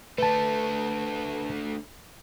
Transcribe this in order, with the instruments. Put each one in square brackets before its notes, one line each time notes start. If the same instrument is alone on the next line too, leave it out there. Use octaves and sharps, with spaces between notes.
[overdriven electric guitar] D3 A3 [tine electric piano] B4 A5